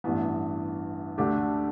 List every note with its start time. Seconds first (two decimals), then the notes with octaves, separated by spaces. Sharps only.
0.04 A1 G2 E3 B3
1.18 D2 D3 A3 D4 G4